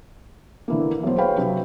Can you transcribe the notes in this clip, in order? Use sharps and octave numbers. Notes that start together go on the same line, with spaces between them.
D3 E3 A#3
B1 C5
G#4 B4 C#5 F5 G5 B5
C3 F#3